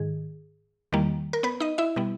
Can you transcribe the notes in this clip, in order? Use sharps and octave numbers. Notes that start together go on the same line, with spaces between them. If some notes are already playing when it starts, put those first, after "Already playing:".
Already playing: G#2 D#3 G#4
E2 D#3 G3 A#3
A#4
B3 B4
D#4 D#5
E4 E5
B2 G3 B3